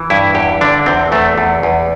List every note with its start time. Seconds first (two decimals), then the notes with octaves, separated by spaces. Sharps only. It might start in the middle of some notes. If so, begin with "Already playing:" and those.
Already playing: E3
0.10 G2 E4
0.35 E2 G4
0.61 D3 D4
0.86 E2 C4
1.12 E2 A3
1.38 E2
1.63 E2